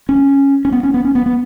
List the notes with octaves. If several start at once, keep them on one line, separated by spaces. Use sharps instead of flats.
C#4
C#4
B3
C#4
B3
C#4
B3
B3